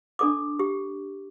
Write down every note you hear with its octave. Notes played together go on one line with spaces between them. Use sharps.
D4 A4 D6
G4